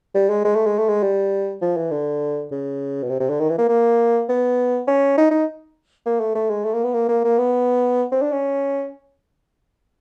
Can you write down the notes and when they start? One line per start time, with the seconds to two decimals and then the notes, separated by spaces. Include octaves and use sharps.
0.15 G3
0.30 G#3
0.45 G#3
0.55 A3
0.66 G#3
0.78 A3
0.89 G#3
1.03 G3
1.62 F3
1.77 E3
1.91 D3
2.51 C#3
3.03 B2
3.10 C3
3.20 C3
3.30 D3
3.40 D#3
3.49 E3
3.59 A#3
3.69 A#3
4.29 B3
4.88 C#4
5.18 D#4
5.31 D#4
6.06 A#3
6.20 A3
6.35 A3
6.50 G#3
6.65 A3
6.74 A#3
6.84 B3
6.94 A#3
7.09 A#3
7.24 A#3
7.38 B3
8.12 C4
8.22 D4
8.32 C#4